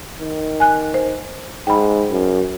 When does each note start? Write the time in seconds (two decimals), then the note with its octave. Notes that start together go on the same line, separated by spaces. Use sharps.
0.19 D#3
0.60 G#5 F#6
0.94 C5
1.67 G#2 G5 B5
2.11 F#2